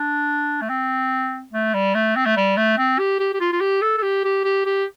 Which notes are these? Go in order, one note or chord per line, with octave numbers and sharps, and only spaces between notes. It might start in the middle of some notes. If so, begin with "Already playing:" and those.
Already playing: D4
A3
C4
A3
G3
A3
C4
A3
G3
A3
C4
G4
G4
G4
F4
F4
G4
A4
A4
G4
G4
G4
G4